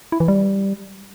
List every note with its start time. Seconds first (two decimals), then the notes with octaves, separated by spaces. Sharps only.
0.12 E4
0.20 E3
0.28 G3